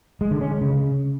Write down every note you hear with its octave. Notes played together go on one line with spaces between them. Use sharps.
G#3
D3
C#4
G#3
C#3